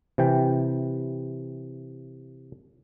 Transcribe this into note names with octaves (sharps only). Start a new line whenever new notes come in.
C3 E3 G5